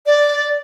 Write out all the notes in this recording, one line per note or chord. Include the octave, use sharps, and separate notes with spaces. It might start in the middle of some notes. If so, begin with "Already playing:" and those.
D5